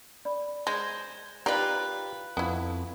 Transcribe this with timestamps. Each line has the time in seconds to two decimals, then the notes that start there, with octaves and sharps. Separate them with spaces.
0.25 D5 B5
0.67 G#3 C5 G#6 A#6
1.46 D#4 F4 G4 B4 D5
2.37 F2 B3 E4